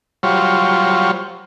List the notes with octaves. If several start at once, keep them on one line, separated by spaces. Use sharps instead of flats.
F#3 G3 F4 C5 C#5